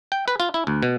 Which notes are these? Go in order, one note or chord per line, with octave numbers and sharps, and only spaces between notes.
G5
B4
F4
E4
D2
B2